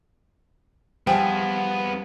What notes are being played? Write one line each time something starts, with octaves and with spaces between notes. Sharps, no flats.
F3 G3 B3 G#4 G5 G#5